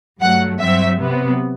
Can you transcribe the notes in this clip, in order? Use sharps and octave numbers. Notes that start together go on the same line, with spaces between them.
G2 F#3 A3 F#5
G2 F#3 C4 E5
C3 F#3 B3